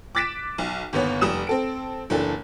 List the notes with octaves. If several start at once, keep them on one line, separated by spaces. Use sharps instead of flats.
D6 F#6 A6 B6 D7 E7
B1
G1 D#2 B3 C#5
F1 G3 D#6 E7
C4 A4 D7
F#1 E3 D4 A4